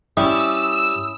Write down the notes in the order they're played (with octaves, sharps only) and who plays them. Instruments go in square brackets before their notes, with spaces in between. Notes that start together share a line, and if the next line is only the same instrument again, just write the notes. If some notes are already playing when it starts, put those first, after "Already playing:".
[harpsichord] G3 [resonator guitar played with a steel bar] C#4 E4 [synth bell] D#6 [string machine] E6